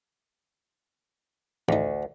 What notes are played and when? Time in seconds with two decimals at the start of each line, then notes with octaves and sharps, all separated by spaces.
1.69 A1 D2 D#4